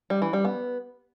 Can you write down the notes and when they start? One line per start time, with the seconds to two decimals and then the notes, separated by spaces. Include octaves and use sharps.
0.10 G3
0.22 E3
0.33 G3
0.45 B3